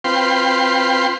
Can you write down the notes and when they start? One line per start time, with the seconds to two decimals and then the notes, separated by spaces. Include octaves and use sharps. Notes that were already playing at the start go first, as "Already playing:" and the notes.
0.04 C4 F4 B4 G5 C6